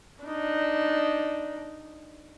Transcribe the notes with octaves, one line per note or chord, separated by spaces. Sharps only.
D4 D#4